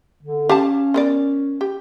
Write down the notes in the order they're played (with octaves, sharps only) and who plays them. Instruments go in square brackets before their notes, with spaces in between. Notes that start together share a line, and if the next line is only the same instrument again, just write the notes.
[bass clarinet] D3
[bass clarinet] C#4 [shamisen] G4 F5 A5
[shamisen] B3 A#4 D5
G4